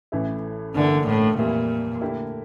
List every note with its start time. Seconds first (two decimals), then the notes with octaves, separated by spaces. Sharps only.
0.12 A1 A2 E3 A3 E4
0.75 G1 G2 D3 E3 A#3 D4
1.07 A2
1.38 F2 A#2 E3 G3 A#3 E4
2.01 D3 A3 E4 G4 A#4